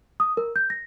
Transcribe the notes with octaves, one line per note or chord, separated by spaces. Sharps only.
D#6
A#4
G6
A#6